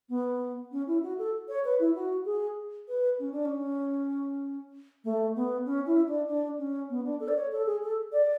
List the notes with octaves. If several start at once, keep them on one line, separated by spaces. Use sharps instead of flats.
B3
C#4
E4
F#4
A4
C#5
B4
E4
F#4
G#4
B4
C#4
D4
C#4
A3
B3
C#4
E4
D4
D4
C#4
B3
D4
A4
D5
C#5
A4
G#4
A4
D5